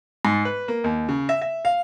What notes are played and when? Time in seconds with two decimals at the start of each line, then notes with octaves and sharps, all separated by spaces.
0.25 G#2
0.45 B4
0.68 A#3
0.84 D#2
1.09 C#3
1.29 E5
1.42 E5
1.65 F5